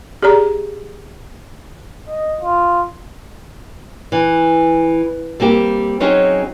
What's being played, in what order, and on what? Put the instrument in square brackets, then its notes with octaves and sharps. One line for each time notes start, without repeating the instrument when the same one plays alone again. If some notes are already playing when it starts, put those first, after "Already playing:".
[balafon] G4 G#4 D5 A#5
[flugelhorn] D#5
F4
[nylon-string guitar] E3
G3 A#3 C4 G4
F#3 C4 C#4 D#4 G#4 C#5